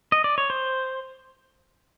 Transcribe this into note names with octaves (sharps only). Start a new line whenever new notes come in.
D#5
D5
C#5
C5